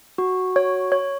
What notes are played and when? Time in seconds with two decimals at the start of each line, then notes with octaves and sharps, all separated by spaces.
0.18 F#4
0.56 C#5
0.92 C#5